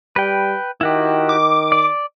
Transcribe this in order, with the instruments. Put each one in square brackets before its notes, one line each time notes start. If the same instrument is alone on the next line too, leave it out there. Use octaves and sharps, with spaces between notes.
[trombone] G3 [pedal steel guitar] B4 G5
[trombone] D#3 [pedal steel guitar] E4 F#4 G4
[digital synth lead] D6
[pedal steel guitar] D5